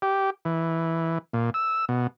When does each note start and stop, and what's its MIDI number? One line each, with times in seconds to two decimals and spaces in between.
0.02 0.30 67
0.45 1.18 52
1.33 1.50 46
1.54 1.85 88
1.89 2.07 47